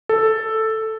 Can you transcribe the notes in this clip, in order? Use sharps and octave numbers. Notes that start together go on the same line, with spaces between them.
A4